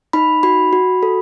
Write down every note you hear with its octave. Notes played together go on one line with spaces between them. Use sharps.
D#4 B5
F#4 B5
F#4
A4